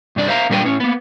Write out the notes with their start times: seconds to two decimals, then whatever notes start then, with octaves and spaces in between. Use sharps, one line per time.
0.16 G2 C3 D4 D5
0.28 C5 E5 F5 A#5
0.50 A#2 G3 D4 A#4 B4 G5
0.63 A2 C#4
0.80 A#3 B3